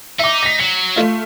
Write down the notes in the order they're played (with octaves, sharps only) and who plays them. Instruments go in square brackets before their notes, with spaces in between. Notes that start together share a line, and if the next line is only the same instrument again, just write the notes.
[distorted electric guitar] D#4 [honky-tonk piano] E5 D6
[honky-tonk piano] A#6 B6
[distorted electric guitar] F#3 [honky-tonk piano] C#7
[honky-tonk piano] A3 F4